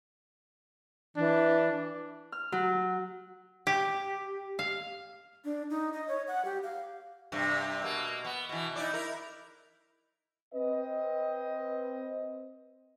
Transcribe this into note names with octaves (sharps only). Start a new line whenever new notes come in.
E3 D4
F6
F#3
G4
F5
D4
D#4
D#5
C#5
F#5
G4
F5
G2 C3
B2 A#3
B3
B2 E3
D#4 E4 D5
E4 A#4
C4 B4 D#5